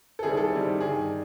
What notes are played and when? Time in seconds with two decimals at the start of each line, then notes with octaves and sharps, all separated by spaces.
0.19 A4
0.23 D#3 G3 C4 E4 G#4
0.33 G#4
0.37 A4
0.51 D#3 G3 C4 E4
0.80 G2 D#3 G3 G#4